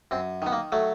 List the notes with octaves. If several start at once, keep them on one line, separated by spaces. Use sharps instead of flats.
F#2 C4
D#3 B3
A#3
F#3 A3